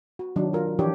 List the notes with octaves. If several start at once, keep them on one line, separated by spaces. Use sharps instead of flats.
F#4
D#3 F#3 D4
F4 A#4
E3 F3 D4 G4 C#5